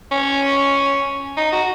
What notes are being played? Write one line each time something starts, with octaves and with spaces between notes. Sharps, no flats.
C#4
D#4
F#4